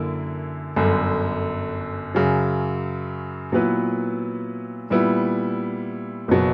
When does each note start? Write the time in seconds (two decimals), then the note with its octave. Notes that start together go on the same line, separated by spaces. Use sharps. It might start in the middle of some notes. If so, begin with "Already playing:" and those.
Already playing: F#2 D3 A#3 E4
0.76 G1 F#2 D3
2.15 F#2 C#3 F#3
3.52 A#2 F#3 B3 E4 B4
4.90 A#2 G3 B3 E4
6.28 F#1 B2 F#3